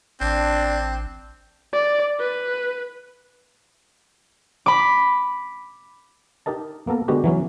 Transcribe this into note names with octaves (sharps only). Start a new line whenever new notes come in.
A1 C4 D4
D5
B4
B5 D6
D#4 G4 A#4 D#5 A5
A#3 B3 A4 A#4
D3 G#3 B3 F#4 G4
E3 F#3 C#4